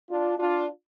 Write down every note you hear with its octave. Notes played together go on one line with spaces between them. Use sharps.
D4 F4
D4 F4